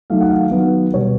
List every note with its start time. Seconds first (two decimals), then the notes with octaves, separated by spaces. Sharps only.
0.10 D#3 F#3 A3 F5
0.21 F#5
0.31 F5
0.51 D#3 F#3 B3 F#5
0.93 B2 G3 B3 C#5